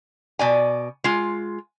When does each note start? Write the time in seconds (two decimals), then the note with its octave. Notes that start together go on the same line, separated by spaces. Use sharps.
0.39 B2 D5 G#5
1.04 G#3 F4